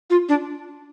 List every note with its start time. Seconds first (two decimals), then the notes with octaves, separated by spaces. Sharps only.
0.10 F4
0.29 D4